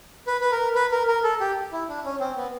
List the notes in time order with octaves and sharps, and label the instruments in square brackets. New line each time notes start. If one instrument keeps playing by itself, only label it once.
[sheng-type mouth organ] B4
B4
A#4
B4
A#4
A#4
A4
G4
E4
D4
C#4
C4
B3